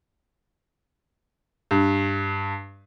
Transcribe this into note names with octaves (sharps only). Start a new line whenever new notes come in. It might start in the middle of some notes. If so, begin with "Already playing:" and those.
G2